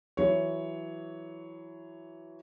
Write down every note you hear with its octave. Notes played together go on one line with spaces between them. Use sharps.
E3 F#3 C#5